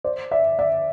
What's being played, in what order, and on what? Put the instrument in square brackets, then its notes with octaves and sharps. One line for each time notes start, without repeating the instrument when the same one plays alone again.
[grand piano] C5 D5
D5 E5
D5 E5